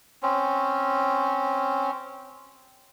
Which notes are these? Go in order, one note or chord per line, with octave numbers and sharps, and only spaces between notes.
C4 C#4